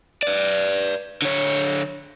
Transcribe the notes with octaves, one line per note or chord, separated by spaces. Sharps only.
B4 D5
D3 C#5